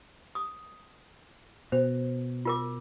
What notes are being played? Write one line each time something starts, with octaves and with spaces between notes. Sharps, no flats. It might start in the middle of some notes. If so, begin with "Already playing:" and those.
D#6
B2 C5
F4 A#4 D6